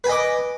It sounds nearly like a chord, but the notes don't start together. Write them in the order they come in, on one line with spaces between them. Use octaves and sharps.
B4 G#5 D#5 D6